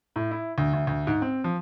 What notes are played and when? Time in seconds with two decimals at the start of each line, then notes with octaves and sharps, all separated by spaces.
0.16 A2
0.31 E4
0.58 D2
0.73 D2
0.87 D2
1.07 G#2
1.22 C4
1.44 F3